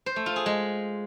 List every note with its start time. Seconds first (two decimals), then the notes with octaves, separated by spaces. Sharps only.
0.06 C5
0.16 A3
0.26 F4
0.36 G#4
0.46 G#3